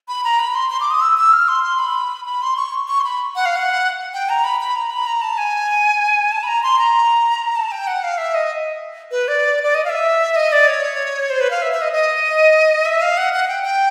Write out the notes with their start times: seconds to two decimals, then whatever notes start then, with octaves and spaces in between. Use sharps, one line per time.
0.08 B5
0.24 A#5
0.39 B5
0.55 C6
0.70 C6
0.80 D6
0.91 D#6
1.01 E6
1.17 E6
1.33 F6
1.48 C6
1.64 C6
1.79 B5
2.25 B5
2.42 C6
2.57 C#6
2.88 C#6
3.00 C6
3.04 B5
3.36 F#5
3.46 F5
3.56 F#5
4.14 G5
4.29 A#5
4.44 B5
4.60 B5
4.76 A#5
4.90 B5
5.07 A#5
5.22 A5
5.38 G#5
6.32 A5
6.43 B5
6.47 A#5
6.63 C6
6.79 A#5
7.55 A5
7.72 G5
7.87 F#5
8.03 F5
8.18 E5
8.35 D#5
9.11 B4
9.28 D5
9.63 D5
9.75 D#5
9.85 F5
9.89 E5
10.36 D#5
10.52 D5
10.68 C#5
11.30 C5
11.41 B4
11.51 F5
11.62 E5
11.72 E5
11.82 D#5
11.93 D#5
12.86 E5
13.02 F5
13.17 F#5
13.33 F#5
13.48 G5
13.63 G5